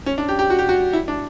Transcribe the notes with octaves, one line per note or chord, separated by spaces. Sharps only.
C#4
D4
G4
G4
F#4
G4
F#4
E4
D4